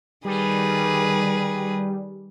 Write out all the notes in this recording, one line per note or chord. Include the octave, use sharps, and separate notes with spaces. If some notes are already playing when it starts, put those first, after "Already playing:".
D#3 G3 G#4 B4